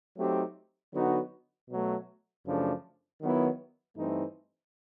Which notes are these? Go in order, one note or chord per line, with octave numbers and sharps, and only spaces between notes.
F#3 A3 C4 D#4 G4
D3 F#3 B3 D#4 F#4
B2 F#3 A3
F#2 C#3 F3 A3 D4
D#3 F#3 B3 E4
G2 E3 A3 C4 D#4